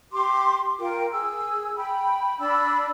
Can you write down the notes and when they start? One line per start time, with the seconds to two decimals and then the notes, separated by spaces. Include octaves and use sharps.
0.12 G4 C6 D6
0.78 F4 A#4 G5
1.11 G#4 E6
1.75 G5 B5
2.39 D4 D5 B5 E6